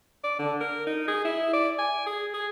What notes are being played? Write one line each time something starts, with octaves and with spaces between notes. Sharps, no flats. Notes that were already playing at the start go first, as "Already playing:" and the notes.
D5
D3
A#4
D#4
G#4
E4
D5
G#5
G#4
G#4